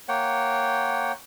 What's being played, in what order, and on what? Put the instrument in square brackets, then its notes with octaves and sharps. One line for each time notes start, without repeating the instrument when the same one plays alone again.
[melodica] A#3 C#5 F#5 G5